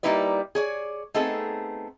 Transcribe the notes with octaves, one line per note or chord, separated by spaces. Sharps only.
G3 A#3 D#4 E4 B4 D5
G#4 C#5 D5
A3 B3 C4 D#4 G#4 A4